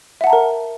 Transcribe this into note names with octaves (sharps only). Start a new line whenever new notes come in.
A#4 E5 F#5 A5 A#5